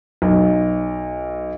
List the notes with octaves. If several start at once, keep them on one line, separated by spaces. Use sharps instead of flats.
B1